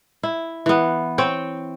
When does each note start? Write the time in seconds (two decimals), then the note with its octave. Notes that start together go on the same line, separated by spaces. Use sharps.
0.23 E4
0.66 E3 B3
1.18 C4 C#5 G5